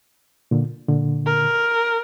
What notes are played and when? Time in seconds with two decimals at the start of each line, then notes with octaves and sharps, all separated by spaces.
0.51 A#2 D3
0.89 A#2 D3
1.26 A#4